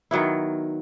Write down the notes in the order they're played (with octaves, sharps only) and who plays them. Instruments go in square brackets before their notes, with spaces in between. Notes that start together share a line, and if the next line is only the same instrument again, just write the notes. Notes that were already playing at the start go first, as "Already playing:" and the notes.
[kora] D#3 F#3 B3 E4